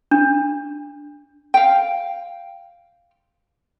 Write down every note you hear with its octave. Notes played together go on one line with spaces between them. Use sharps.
D4
F5 G5